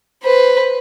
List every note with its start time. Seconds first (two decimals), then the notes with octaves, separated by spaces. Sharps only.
0.23 B4 C5